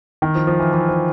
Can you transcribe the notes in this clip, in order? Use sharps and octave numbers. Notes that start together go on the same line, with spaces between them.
D#3
F3
F3
E3
E3
F3